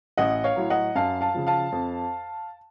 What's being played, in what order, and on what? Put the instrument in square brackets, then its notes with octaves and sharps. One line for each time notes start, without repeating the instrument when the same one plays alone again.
[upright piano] A1 D#5 F#5
C#5 F5
A2 F#3
D#5 F#5
F#2 F5 A5
F5 A5
C#3 F3
F5 A5
F2